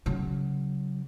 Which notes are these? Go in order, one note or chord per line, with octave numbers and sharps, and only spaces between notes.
C#3 F#3